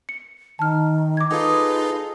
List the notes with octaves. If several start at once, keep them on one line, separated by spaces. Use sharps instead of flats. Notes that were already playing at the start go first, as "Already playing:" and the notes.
C#7
D#3 A5 F6
D6 G#6
D#4 F4 G#4 A4 B4 D#5